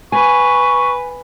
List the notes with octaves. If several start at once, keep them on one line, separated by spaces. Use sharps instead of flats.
B4 G#5 C#6